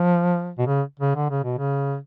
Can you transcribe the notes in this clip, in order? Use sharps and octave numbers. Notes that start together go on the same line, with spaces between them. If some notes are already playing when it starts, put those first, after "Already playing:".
Already playing: F3
B2
C#3
C#3
D3
C#3
B2
C#3